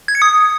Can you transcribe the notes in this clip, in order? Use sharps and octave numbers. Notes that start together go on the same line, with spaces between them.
G#6
C#7
D#6